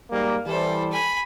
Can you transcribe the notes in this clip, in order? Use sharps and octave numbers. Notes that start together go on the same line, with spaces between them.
G#2 G3 A#3
E3 G3 A4 C5
G#5 B5